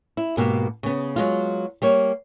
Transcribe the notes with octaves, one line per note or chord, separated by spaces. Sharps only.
E4
G#2 B2 A#3 G4
C#3 B3
F#3 G#3 F4
G3 A#3 C#5